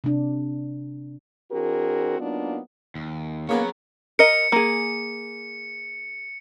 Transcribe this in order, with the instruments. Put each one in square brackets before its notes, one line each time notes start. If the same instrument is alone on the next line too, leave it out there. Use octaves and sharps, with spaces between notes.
[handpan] C3 D4
[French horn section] E3 C4 D4 F#4 G#4 A#4
F#3 A#3 B3 D4 D#4 F4
[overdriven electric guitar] D#2
[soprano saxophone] A#3 [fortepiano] B3 C#4 [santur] G#4 A#4 [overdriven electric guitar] C#5 F#5
[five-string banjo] A#4 D#5 [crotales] C#7
[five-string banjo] A#3 G#4